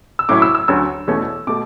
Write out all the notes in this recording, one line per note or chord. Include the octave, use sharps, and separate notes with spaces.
E6
A2 F#3 C#4 E4 D6
E6
E6
D2 D3 F#3 C#4 E6
E2 B2 A3 C#4
B2 A3 D6